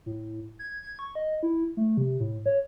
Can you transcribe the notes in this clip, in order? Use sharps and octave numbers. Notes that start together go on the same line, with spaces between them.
A2
G#6
G#6
C#6
D#5
E4
A3
C3
A2
C#5